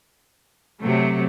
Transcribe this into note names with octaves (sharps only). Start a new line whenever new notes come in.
C3 F#3 A3